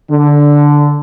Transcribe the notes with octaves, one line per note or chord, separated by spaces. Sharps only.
D3